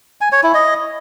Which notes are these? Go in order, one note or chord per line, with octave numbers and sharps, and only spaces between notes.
G#5
C#5
E4
D#5